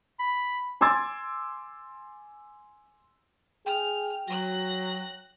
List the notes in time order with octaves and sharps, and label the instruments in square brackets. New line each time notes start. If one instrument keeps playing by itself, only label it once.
[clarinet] B5
[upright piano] G#5 C6 D6 E6 G#6 A6
[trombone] G#4 [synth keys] G5 [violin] F6
[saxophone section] F#3 [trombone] F#4 [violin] F#6 A#6